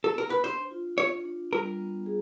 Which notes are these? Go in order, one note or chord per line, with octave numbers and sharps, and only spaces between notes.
A4
A#4
B4
D4 C5
F4
F4 C#5
D4
G3 A#4
B3
G#4